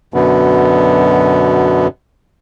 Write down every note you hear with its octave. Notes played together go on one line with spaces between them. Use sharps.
F#2 B2 D3 B3